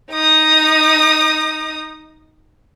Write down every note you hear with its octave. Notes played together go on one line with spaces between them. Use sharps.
D#4 D#6